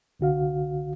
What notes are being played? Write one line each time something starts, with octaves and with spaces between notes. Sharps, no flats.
C2 D3 F#4 F5